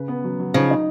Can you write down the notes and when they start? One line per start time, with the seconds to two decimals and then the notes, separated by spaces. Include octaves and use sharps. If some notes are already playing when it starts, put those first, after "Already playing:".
Already playing: C#3 B4
0.08 B3
0.24 F#3
0.39 F#3
0.54 C#3 F3 D#4
0.70 D#4